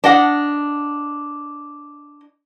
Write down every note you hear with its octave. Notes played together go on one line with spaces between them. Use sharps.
D4 D#5 F#5